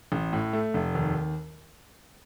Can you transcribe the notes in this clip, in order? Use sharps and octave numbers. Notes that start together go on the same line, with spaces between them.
A1
A2
A3
F1
D#2